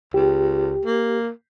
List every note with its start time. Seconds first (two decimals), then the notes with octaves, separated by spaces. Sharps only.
0.14 C#2 G4
0.85 A#3